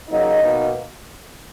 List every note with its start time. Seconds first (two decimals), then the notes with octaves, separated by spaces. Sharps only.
0.08 C#3 F#3 A#3 D#4 D#5
0.40 B2 A#3 D#4